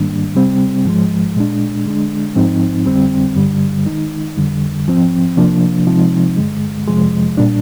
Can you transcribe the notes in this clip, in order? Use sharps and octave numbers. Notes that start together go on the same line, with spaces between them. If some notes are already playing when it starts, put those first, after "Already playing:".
Already playing: G#2 D#3 G3 A#3 D4
C3 G3 C4
G#2 F3 G#3
A#2 G#3 D4
D3 G#3 D4
G#2 F3 C4 D#4
F2 D3 G3 C4
G2 D3 G3
D#3 G#3 D#4
F2 D3 G3
G#2 F3 C4
C3 F3 A#3 D4
C3 F3 G#3 C4 D#4
G2 D3 G#3
F2 C3 F3 G#3
A#2 G3 D4